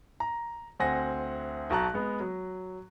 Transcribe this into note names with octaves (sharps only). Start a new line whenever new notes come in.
A#5
D2 C4 F#5 G#5 A#6
B1 F#4 A5 A#5 F#6
G#3 B3
F#3